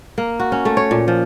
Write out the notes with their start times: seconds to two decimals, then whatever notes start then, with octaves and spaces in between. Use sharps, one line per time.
0.18 A#3
0.40 F#4
0.52 C#4
0.65 A3
0.77 C#5
0.91 A#2
1.08 F3